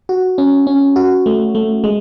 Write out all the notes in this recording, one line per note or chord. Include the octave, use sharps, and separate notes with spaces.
F#4
C#4
C#4
F#4
A3
A3
G#3